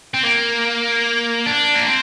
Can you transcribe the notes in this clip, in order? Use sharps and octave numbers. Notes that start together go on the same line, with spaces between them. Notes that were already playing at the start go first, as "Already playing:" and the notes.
C4
A#3
D4
A#3
C4